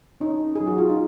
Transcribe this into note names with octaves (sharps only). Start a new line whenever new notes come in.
C#4 D#4
F#3 G#4
F#4
F4
D#4